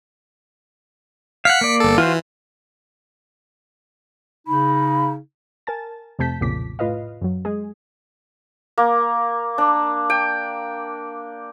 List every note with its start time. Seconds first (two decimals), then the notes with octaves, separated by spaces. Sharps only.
1.45 F5 F#5 B6 C#7
1.61 A#3 D5
1.80 G1 A4
1.98 E3 F4 F#4 C5
4.48 C#3 D#4 B5
5.67 A#4 G#5 A5 A6
6.19 F2 C3 A3 A5 G6 B6
6.41 B1 F2 A#2 C#3 D6 B6
6.79 A2 F4 B4 D#5 F5
7.22 F#2 F#3
7.45 G#3 G#4
8.78 A#3
9.58 D4
10.10 G5